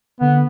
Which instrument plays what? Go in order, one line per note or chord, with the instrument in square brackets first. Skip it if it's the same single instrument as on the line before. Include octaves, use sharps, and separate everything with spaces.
[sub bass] D3 [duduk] B3